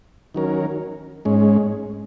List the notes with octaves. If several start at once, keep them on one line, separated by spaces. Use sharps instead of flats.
D#3 F#3 C#4 A#4
G#2 G#3 C#4